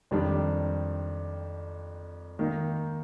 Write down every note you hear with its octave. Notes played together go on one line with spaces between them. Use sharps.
F2 D#3 G3 D4
D#3 A#3 D#4